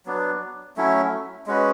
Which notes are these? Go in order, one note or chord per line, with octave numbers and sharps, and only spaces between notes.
F#3 B3 D4
F#3 A3 C#4 E4
G#3 C#4 F#4 B4